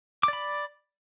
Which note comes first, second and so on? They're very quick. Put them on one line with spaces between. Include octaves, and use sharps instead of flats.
D6 D5 B5